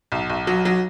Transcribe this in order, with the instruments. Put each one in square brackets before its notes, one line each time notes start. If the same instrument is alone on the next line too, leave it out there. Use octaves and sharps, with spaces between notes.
[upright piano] B1
B1
F#3
F#3